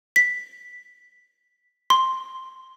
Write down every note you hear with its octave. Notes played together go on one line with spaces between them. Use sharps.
B6
C6